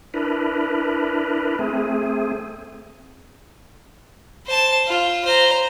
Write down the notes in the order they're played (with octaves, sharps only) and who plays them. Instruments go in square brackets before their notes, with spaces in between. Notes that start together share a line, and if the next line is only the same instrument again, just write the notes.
[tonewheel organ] D4 E4 A#4 B4
A3 C4 G#4
[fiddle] C5 A5
F4
C5 A#5